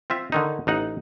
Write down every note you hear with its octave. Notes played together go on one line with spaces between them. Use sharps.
C4 F4 E5
D3 D#3 D#4
A1 D#4 F#5